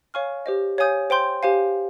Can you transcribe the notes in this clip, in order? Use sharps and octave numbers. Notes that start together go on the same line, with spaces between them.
C#5 F5 G#5 C#6 F6
G4 C5 D#5
C#5 F5 G#5 D#6 G6
C5 G5 C6 G6
G4 C5 F5 G#5